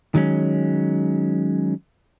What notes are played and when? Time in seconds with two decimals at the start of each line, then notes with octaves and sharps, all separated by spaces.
0.15 D#3 F#3 G#3 C#4